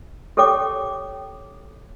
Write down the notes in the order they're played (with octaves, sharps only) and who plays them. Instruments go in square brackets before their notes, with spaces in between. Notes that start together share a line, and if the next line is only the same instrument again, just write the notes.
[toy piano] G4 A4 C#5 G5 D6